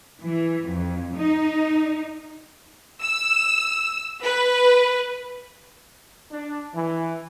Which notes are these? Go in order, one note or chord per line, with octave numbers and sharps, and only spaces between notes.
E3
F2
D#4
E6
B4
D4
E3